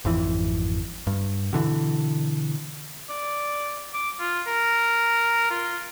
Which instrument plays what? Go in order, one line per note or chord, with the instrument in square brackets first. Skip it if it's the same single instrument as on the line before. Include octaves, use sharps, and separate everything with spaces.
[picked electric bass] G#1 F2 E3
G2
B2 D3 E3
[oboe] D5
D6
F4
A#4
F4